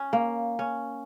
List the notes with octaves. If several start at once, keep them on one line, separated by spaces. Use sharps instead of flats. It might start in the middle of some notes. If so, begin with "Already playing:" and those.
Already playing: C#4
A#3
C#4